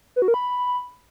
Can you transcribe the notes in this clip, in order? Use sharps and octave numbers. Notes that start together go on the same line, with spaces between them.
B4
F#4
A#4
B5